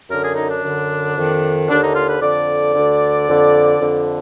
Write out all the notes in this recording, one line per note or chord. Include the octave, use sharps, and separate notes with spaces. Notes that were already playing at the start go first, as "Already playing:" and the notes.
F#2 D3 A#4
G#4
D#4
D4
F#2 D3
F2 D#3
D#2 D3 D4
D#4
F4
B4
F2 D3 D5
D2 D3
F2 D3
F2 D3